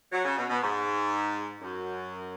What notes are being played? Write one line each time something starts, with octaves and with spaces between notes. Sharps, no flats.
F#3
C#3
B2
B2
G#2
F#2